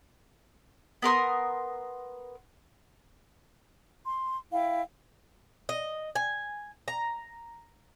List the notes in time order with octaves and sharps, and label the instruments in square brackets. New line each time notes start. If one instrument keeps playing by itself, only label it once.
[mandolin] B3 A#4 C6 D#6
[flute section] C6
E4 F5 G5
[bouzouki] D#5
G#5
A#5